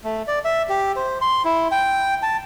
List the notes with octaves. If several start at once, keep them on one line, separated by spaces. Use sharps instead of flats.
A3
D5
E5
G4
C5
C6
E4
G5
A5